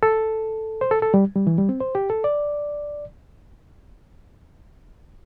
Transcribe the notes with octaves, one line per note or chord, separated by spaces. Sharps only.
A4
C5
A4
A4
G3
G3
E3
G3
C4
C5
G4
A4
D5